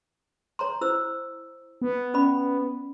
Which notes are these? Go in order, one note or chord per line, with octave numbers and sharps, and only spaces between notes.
C#5 A#5 C6
E4 C5 E6
B3
C#4 D5 B5